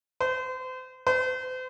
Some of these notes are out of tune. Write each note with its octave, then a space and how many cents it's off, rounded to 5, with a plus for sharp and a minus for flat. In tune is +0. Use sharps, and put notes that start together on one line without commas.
C5 -35
C5 -40